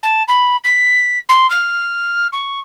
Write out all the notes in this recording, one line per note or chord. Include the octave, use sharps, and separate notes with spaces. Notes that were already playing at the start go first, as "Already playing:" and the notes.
A5
B5
B6
C6
F6
C#6